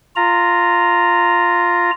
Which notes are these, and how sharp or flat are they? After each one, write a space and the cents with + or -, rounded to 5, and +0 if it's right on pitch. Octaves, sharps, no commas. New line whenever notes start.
F4 +0 A#5 -10